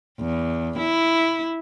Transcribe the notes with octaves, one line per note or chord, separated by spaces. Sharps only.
E2
E4